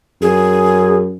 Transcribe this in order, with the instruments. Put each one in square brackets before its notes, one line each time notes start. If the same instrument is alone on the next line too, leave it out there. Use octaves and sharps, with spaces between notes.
[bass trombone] F#2 [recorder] G#4